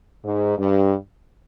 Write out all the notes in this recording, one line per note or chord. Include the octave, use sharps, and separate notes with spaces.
G#2
G2